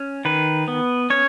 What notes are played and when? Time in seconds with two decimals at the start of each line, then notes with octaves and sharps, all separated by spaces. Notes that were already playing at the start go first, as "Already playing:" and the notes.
Already playing: C#4
0.25 D#3 B4
0.68 B3
1.10 C#4 C#5